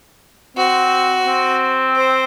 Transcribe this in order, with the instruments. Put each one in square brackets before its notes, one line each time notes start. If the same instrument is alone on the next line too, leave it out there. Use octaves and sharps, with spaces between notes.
[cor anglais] C4 [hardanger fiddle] F#4
[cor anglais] C4
[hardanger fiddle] C5